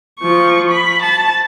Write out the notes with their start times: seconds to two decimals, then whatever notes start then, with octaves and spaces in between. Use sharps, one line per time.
0.20 F3 C#6
0.71 B5
1.02 A5